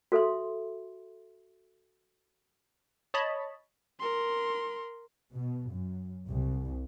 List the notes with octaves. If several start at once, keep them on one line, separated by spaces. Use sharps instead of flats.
F#4 A4 E5 C6
C#5 D#5 A5 B5
A#4 C6
B2
F#2
C2